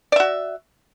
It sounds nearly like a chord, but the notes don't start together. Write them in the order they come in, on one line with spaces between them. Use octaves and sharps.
D5 E5 F#4